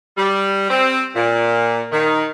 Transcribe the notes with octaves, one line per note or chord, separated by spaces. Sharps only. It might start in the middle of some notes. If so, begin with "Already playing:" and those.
G3
C4
A#2
D#3